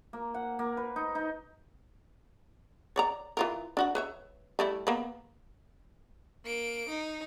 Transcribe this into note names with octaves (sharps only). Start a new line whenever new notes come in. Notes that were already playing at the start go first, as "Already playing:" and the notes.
A#3
F#5
A#3
B4
D#4
D#4
C#5 D5 A#5
E3 F4 A#4
D4 F#4 F#5
B4 C#5 E5
G3 A3 E4
A#3 B3
A#3 D7
D#4